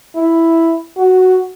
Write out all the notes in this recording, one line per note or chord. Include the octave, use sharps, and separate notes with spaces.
E4
F#4